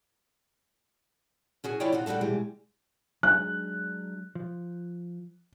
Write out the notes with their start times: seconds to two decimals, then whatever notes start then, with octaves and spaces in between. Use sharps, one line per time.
1.64 C#4 F#4 G#4
1.80 E3 E4 F4 C#5 D5 G5
1.92 C4 D#4 F4 F#4
2.06 G3 D4 D#4 F#4 A4
2.21 B2 E3 G3 G#3
3.23 F#3 G#3 D4 F#6
4.35 F3